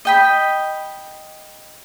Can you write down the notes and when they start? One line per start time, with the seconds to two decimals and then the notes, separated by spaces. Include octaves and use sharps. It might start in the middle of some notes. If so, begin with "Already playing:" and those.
0.05 D#5 G5 B5